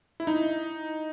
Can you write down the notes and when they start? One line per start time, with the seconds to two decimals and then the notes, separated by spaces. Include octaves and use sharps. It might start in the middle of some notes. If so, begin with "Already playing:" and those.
0.20 E4
0.27 D#4